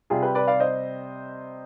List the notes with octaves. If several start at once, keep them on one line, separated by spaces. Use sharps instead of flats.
C3 G3 F4 G#4
G4 B4
B4 D5
D5 F5
C5 D#5